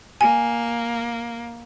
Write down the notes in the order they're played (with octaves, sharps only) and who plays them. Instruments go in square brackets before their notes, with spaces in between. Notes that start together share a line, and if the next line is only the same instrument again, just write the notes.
[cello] A#3 [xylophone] G#5